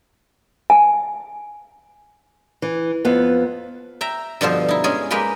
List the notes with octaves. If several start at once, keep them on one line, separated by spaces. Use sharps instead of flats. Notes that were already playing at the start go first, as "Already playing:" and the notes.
G#5
E3
F2 B3
E5 G5 A#5
G2 B2 D3 F3 C5
D#4 E4
G#3 C#4 G#4
G#3 A#3 G4 A#4 B4 G5